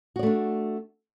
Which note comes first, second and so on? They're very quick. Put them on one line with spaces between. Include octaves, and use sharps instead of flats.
F#4 D5 A3 D4